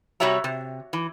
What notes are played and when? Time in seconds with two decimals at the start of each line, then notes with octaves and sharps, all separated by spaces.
0.20 C3 G3 F#4 C#5 E5 A#5
0.44 C3
0.93 E3